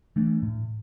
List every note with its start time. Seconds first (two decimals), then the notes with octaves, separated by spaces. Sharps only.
0.16 E3 A3 D4
0.42 A2